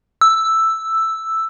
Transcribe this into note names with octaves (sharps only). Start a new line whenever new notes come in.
E6